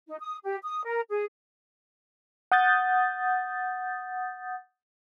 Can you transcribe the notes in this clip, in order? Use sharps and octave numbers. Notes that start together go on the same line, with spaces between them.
D#4
D#6
G4
D#6
A#4
G#4
F#5 D#6 G6 A6